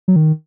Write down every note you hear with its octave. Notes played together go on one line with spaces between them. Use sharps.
F#3
D#3